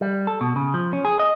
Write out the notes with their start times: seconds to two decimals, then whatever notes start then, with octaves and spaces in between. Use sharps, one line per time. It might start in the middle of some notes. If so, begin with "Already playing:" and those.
0.01 G3
0.27 A4
0.41 B2
0.56 C#3
0.74 F3
0.93 C#4
1.05 G#4
1.19 D#5